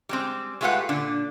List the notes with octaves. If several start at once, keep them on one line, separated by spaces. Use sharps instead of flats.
G3 G#3 C4
G#3 A3 F4 G4 B4 F#5
A#2 D3 D4